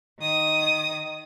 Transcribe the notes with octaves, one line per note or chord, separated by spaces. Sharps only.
D#3 D#6